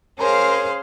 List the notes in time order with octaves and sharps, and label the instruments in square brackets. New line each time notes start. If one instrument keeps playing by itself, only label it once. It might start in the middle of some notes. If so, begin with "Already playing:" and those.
[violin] C#4 [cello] G#4 F5 [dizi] A#4 [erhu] C5